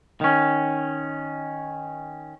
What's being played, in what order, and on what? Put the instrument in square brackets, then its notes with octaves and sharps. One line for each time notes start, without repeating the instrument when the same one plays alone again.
[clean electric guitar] D#3 C#4